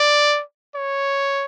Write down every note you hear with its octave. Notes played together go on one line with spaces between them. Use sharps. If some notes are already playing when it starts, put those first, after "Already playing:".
Already playing: D5
C#5